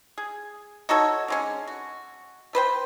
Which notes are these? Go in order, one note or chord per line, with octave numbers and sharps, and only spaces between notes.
G#4
D#4 F#4 A4 C#5
D3 G#3 C#4
F#4
A3 B4 C5 G5